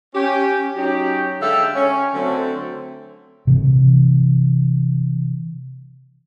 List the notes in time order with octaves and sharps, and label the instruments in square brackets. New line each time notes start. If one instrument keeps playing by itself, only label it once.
[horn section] C#4 G4
F#3 C#4 D#4 F#4 G4
D3 G#3 A4 E5 F5 G5
C#4
D3 F#3 A3 C4
[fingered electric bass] C3 E3